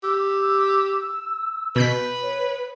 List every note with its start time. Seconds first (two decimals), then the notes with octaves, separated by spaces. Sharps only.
0.04 G4 E6
1.76 B2 B4 G6 B6
2.22 C#5